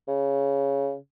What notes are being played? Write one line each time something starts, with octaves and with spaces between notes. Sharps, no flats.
C#3